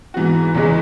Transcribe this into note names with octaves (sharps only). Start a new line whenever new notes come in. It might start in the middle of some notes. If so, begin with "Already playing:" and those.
G#2 E3 B3 F#4
E2 C#3 E3 G#3